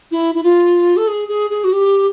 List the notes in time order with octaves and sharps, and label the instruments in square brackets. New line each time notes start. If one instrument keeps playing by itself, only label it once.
[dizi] E4
E4
F4
A4
G#4
G#4
G#4
F#4
G4